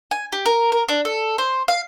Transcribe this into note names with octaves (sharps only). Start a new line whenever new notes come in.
G#5
G4
A#4
A#4
D4
A4
C5
F5